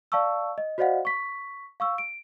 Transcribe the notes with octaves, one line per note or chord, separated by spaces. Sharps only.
D5 F5 A5 C#6 E6
D#5
F#4 C5 D5 D#5 F5 F#5
C#6 B6
F5 C#6 E6
D7